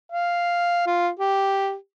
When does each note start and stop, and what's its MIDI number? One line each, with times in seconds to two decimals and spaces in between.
0.12 0.83 77
0.87 1.09 65
1.19 1.74 67